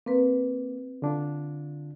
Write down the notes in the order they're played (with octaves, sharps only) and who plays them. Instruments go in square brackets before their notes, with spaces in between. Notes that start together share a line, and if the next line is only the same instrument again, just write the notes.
[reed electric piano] A#3 [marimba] C4 B4
[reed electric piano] D3 D4 F4